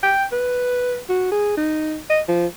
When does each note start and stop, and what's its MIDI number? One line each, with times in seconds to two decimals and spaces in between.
0.03 0.25 79
0.32 0.99 71
1.09 1.27 66
1.32 1.56 68
1.57 1.98 63
2.10 2.21 75
2.28 2.46 53